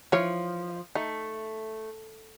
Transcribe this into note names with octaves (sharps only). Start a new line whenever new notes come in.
E3 F3 C#5
A3 D#4